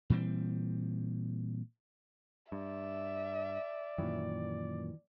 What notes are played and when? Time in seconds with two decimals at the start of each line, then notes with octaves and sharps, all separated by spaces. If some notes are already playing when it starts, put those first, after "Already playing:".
0.10 A#2 E3 G3 C4
2.52 G2 D5 E5
3.98 F#2 A#2 D#3 E3 F#3